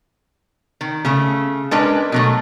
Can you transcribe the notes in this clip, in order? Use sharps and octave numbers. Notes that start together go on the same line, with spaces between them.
D#3
C#3 A3
G#3 C#4 D4 A#4 B4
B2 F#3 A3